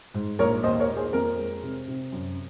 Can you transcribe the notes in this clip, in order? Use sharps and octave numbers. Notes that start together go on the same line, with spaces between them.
G#2
A#1 A#4 C#5
D#2 C5 D#5
A#4 C#5
A#3
G#4 C5
F2 A#4
G#3
C3
C3
F#2